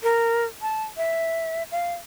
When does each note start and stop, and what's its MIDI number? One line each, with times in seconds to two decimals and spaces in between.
0.03 0.45 70
0.62 0.84 81
0.97 1.63 76
1.71 1.94 77